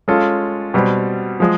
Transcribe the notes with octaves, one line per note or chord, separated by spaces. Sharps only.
G#3 C#4 F4 A4
B2 G3 C4
F3 G#3